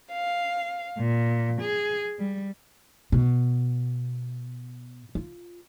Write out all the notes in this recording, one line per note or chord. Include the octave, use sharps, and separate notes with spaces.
F5
A#2
G#4
G3
B2
F4